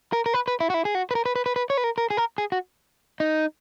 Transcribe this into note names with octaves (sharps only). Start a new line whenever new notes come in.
A#4
A#4
B4
B4
E4
F#4
E4
G#4
F#4
B4
A#4
B4
B4
B4
B4
C#5
B4
A#4
A#4
G#4
A#4
G#4
F#4
D#4